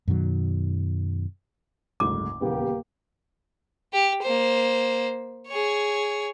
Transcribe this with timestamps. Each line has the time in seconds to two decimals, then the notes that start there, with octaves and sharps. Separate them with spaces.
0.08 F#2 B2 D#3 F#3
2.00 F#1 D2 G#2 D6
2.41 D#1 E2 C#3 A#3 B3 G4
3.93 G4
4.22 A#3 C5
5.48 G#4 C#5